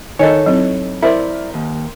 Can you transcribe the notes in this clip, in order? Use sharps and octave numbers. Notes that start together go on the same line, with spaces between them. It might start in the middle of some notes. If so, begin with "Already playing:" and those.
D#3 D#4 A4 C#5 D#5 G#5
F#3 C4 D#4 E4
E4 A#4 C5 D5 E5
D#2